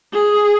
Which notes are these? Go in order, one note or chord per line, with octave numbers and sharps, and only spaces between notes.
G#4